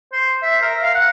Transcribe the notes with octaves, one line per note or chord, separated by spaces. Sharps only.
C5
E5
A#4
F5
F#5